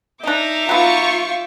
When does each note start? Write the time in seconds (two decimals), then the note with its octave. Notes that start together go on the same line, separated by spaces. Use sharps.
0.24 D4 D#4 D#5 E5 A#5 D6 G6
0.69 F#3 B3 F4 C#6